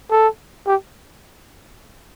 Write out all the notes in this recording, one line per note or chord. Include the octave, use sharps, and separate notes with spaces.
A4
G4